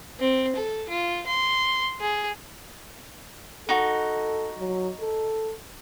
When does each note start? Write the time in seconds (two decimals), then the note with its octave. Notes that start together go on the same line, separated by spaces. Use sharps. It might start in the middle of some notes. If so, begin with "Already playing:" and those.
0.20 C4
0.56 A4
0.89 F4
1.27 C6
2.01 G#4
3.69 D#4 F#4 A4
4.58 F#3
5.01 A4